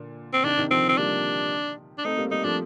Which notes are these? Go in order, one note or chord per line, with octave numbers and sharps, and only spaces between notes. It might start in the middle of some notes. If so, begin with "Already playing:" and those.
Already playing: A#2 D3
C4
C3 D#3 D4
C3 D#3
D3 F3 C4
C4
G3 A#3 D4
D4
A3 C4 D#4
G3 A#3
G3 A#3 D#4
F3 A3 D4